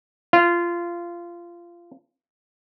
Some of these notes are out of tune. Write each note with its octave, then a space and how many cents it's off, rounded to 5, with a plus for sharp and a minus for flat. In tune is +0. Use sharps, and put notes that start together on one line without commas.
F4 -20